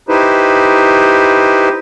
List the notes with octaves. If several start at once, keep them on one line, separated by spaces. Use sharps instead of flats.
D#4 E4 G4 B4 C5